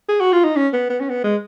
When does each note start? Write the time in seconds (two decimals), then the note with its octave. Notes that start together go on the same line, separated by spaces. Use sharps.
0.09 G#4
0.20 F#4
0.32 F4
0.44 D#4
0.56 C#4
0.73 B3
0.90 B3
1.00 C#4
1.09 B3
1.24 G#3